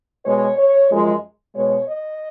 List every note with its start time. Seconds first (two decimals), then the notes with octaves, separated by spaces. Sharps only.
0.25 B2 G#3 C#5
0.58 C#5
0.90 F#2 F3 G#3
1.55 B2 G#3 C#5
1.87 D#5